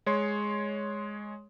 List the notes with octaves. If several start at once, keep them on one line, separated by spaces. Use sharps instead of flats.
G#3 C#5 C6